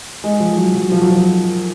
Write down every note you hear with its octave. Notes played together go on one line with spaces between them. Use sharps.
G#3
F3
F#3
F#3
F3
F#3
F3